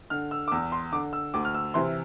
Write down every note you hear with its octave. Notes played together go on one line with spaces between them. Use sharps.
D3 F6
E6
D6
E2 E6
C6
D3 D6
E6
D2 D6
F6
E6
C3 E3 C6